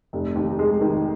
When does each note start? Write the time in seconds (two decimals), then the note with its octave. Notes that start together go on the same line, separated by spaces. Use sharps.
0.13 F1
0.35 D#2
0.59 G#3
0.81 D#3